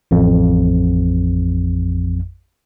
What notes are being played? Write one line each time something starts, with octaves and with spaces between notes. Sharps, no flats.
A1 F2